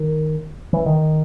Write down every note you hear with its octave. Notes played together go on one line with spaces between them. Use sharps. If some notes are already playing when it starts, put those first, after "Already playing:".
Already playing: D#3
E3
D#3